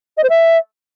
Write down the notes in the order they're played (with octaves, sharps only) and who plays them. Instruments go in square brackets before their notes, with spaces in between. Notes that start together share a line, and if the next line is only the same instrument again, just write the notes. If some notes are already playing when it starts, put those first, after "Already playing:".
[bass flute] D#5
C5
E5